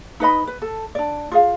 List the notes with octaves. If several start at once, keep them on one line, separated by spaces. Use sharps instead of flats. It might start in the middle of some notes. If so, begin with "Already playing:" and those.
D#4 B4 D#5 B5
B4
A4
D4 D5
F4 G#4 F5